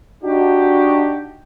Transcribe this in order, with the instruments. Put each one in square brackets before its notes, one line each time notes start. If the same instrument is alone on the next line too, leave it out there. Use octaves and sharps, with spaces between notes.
[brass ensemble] D4 D#4 F#4 G4